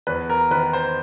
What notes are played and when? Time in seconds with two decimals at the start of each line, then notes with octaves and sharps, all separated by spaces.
0.07 E2 B4
0.29 A#4
0.51 D#3 B4
0.73 C5